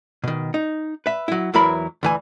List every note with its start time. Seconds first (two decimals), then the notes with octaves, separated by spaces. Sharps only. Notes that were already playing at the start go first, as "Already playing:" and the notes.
0.24 B2 D#3
0.54 D#4
1.06 B4 E5
1.28 F#3 E4
1.54 E2 E3 F#3 E4 A#4 B5
2.03 D2 E3 G#5